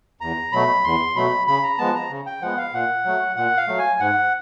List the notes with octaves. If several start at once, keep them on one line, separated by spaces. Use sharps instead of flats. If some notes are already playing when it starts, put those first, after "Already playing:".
E2 A#5
B2 F#3 A3 B5
E2 C6
B2 F#3 A3 B5
C#3 B5
A#5
F3 G#3 B3 A5
A#5
C#3
G5
F3 G#3 B3 F#5
F5
A#2 F#5
F#3 A3
A#2 F#5
F5
F#3 A3
G#5
G#2 F#5